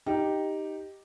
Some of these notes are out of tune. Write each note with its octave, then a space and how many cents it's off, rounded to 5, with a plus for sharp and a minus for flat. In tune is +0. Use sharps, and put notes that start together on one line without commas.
D#4 +0 G4 +0